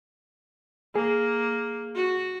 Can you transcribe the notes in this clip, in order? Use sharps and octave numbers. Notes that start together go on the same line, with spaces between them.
A#3 G#4
F#4